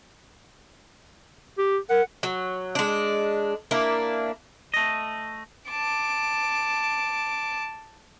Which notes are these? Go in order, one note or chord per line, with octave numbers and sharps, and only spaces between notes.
G4
A#4 F#5
F#3
G#3 D4
A#3 D4 E4
A3 D#5
A5 D6